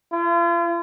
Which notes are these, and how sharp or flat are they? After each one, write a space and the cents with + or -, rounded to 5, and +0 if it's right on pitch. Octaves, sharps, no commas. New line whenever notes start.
F4 -40